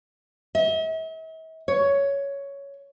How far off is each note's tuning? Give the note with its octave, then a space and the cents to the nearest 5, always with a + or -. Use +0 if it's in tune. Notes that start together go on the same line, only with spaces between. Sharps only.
E5 -45
C#5 +10